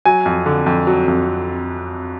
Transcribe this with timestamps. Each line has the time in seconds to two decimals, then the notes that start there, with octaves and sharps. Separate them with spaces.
0.05 F#3 G#5
0.26 F2
0.46 D3
0.66 F2
0.87 F#3
1.08 F2